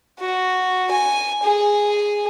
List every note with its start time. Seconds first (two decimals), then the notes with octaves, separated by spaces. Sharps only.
0.20 F#4
0.91 G#5
1.43 G#4